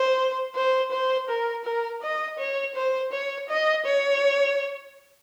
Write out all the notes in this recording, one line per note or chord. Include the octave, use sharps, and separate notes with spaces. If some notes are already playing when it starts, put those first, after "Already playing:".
Already playing: C5
C5
C5
A#4
A#4
D#5
C#5
C5
C#5
D#5
C#5